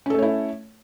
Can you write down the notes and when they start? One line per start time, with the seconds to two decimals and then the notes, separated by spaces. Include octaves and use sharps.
0.06 C#4
0.10 A4
0.14 A3
0.18 C#5
0.23 E4